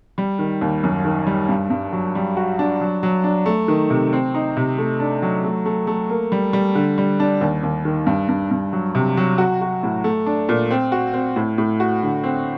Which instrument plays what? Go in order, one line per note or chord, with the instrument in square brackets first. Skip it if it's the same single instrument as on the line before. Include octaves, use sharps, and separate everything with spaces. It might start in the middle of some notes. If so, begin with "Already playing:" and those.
[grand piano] G3
D#3
D#2
F#2
D#3
G3
G2
G2
F#3
G3
F#4
D4
F#3
F#3
D4
A3
D#3
C3
C4
D#4
C3
A3
D4
F#3
A3
A3
A3
A#3
G3
G3
D3
G3
D4
D#2
D#2
D#3
G2
G2
G2
F#3
C3
F#3
F#4
F#4
A2
A3
D4
A#2
C4
F#4
C4
A2
A2
F#4
D3
C4